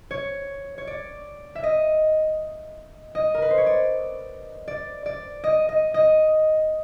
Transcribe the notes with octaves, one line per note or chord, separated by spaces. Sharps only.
C#5
C#5
D5
E5
D#5
D#5
A#4
B4
C5
C#5
D5
D5
D5
D#5
D#5
D#5